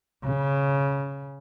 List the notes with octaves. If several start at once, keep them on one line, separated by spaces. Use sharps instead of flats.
C#3